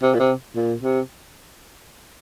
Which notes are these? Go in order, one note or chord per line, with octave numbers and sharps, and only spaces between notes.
C3
A#2
C3
A#2
C3